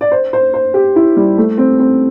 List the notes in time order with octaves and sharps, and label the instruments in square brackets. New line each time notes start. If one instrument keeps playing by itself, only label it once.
[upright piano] D5
C5
C5
C5
G4
E4
G3
A3
C4
C4